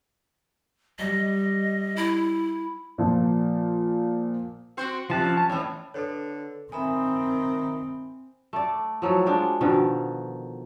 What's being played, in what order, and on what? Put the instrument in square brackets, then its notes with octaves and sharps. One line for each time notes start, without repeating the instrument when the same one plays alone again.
[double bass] G3 [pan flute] D#5
[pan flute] E4
[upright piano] A#2 F3
[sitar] C4 F#4 C5
[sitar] C3 [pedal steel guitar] F3 A5 F#6
[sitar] C#4
[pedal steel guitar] A5
[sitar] E2 A2 [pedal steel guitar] C#5
[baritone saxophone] D3 [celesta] A4 B4 C#5
[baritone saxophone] D#3 [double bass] C4 [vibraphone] E5 B5 D#6 [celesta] G#5
[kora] A3 D5
F3 F#3 E4 A4
G#3 D4 F4 G5
B2 D3 D#3 F3